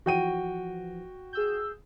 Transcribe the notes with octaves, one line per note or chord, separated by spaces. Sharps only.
E3 F3 F#4 G5 D#7
G#4 E6 G6